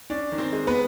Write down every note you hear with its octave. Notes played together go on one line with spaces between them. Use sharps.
C#4 D4 D5
D#3
C4 C5
G#3
B3 B4